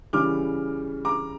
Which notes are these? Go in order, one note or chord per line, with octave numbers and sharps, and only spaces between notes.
C#3 E3 G3 D6 F6
A#5 D6